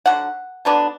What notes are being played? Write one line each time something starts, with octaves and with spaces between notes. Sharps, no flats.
D3 F#3 F#5
D3 F#3 B3 D4